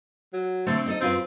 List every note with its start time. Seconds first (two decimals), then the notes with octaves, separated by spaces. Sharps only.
0.33 F#3
0.66 D3 A3 C4
0.86 D#4 A4 D#5
1.00 F#2 C4 F4 B4